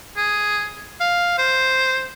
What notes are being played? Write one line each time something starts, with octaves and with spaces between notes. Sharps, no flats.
G#4
F5
C5